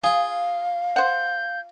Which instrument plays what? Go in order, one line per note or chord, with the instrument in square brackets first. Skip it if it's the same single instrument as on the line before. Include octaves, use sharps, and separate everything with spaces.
[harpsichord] F4 [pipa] G#4 [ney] F5
[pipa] C5 F#5 [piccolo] G6